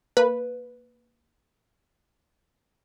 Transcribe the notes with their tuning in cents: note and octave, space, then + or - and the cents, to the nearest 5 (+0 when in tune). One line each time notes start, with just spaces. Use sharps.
A#3 +0 B4 +0